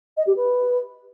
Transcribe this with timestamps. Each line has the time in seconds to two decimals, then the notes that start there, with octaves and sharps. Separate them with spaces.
0.17 D#5
0.26 G4
0.36 B4